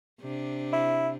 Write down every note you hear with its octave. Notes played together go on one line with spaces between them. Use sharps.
C3 D4
E4